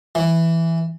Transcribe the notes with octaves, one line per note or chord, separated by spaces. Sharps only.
E3